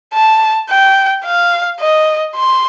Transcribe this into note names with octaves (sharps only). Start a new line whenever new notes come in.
A5
G5
F5
D#5
C6